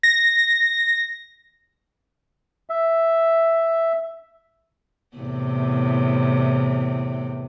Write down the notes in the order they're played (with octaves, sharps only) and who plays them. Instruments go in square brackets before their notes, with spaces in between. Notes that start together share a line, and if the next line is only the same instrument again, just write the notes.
[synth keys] A#6
[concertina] E5
[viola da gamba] E2 A2 C3